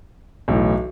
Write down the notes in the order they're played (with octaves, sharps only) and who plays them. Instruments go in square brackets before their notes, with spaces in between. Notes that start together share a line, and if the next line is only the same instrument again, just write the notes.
[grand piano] B1 A2 E3